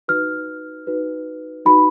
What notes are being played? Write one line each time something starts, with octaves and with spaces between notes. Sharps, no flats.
D#4 F#4 B4 F6
D#4 F#4 B4
D#4 F#4 B4 B5